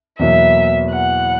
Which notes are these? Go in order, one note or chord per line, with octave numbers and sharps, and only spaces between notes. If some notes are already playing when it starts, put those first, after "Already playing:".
E2 B2 F#3 A#3 E5
F#5